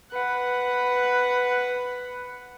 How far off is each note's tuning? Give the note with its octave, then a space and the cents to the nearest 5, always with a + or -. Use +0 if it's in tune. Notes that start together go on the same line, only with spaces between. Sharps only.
B4 +5 F#5 +0